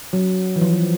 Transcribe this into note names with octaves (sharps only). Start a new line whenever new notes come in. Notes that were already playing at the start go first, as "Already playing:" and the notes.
F#3
E3
F3